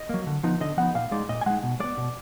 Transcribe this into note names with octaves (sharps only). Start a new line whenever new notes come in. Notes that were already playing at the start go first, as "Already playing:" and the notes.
Already playing: D#5
F#3 A#3
D3
F3 B3 D#4
D3 D#5
F3 B3 D#4 F#5
A#2 F5
G#3 D#4 D5
A#2 D#5
G#5
G#3 D#4 F#5
B2
G#3 B3 D5
B2